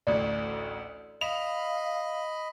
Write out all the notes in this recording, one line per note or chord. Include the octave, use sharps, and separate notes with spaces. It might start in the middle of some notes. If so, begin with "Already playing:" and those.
A1 D2 D5
D#5 F5 B5 F7